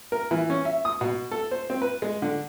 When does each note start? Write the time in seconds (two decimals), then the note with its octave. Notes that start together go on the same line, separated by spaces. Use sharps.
0.12 A#4
0.31 E3
0.50 C#4
0.65 E5
0.85 D#6
1.01 B2
1.31 A4
1.51 C5
1.70 C4
1.82 B4
2.02 G#3
2.22 D3